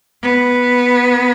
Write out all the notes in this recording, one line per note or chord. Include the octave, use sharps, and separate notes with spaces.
B3